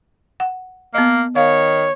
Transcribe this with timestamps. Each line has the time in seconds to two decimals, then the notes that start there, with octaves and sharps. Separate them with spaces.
0.40 F#5
0.95 A#3 B3 D#5
1.36 D#3 C#5 F5